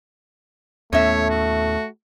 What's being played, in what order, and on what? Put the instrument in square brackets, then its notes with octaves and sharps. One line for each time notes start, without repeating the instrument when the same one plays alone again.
[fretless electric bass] D#2 B3 C#4 [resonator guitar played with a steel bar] A2 E5 [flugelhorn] A3 [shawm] C#5
[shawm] F#4